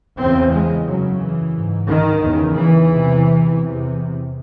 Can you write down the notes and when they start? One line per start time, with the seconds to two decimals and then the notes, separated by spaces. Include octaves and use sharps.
0.17 E2 C#3 C4
0.52 G#3
0.85 F#2 C#3 F#3
1.20 E3
1.54 G#2
1.88 D#3
2.22 E2 C#3
2.56 E3
2.90 E2 C3
3.59 E2 C3